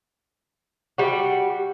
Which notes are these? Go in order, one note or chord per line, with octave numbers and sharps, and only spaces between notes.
G3 F#4